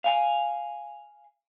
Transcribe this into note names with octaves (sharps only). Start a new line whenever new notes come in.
F5 G#5